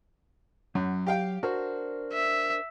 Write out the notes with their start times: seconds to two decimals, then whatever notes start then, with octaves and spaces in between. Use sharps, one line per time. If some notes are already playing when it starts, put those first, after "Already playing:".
0.75 F#2 F#3
1.07 G4 F5 G5
1.43 D4 F#4 A#4 C5
2.13 E5